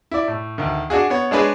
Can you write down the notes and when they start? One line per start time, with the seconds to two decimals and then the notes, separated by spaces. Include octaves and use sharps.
0.11 E4 D5
0.28 A2
0.58 D2 D#3
0.90 D4 F#4 G#4
1.10 B3 C#5
1.31 G#3 D4 G#4 B4 C#5